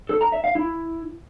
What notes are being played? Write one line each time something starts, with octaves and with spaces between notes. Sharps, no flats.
A4
A#5
E5
F5
E4